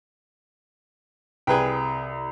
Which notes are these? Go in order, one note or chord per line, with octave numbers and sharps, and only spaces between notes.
C2 G#4 B4 G5